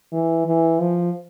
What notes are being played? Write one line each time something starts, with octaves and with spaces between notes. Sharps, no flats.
E3
E3
F3